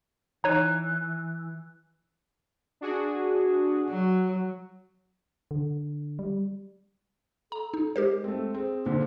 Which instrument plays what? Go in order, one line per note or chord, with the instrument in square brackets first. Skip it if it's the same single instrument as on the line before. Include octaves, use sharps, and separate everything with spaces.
[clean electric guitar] E3 [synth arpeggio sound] D#4 C#5 D#7
[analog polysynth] D4 F#4 G#4
[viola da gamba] F#3
[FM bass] D3
G3
[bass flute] A4 [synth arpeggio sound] A#5
[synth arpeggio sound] D#4
[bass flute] G#3 [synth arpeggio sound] G4 A#4 C5
[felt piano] A3 C4
[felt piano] C4 [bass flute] G#4
[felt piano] A#2 D3 [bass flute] C5